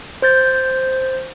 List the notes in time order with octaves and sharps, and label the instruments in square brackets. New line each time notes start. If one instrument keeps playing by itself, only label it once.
[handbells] C5 G6 A6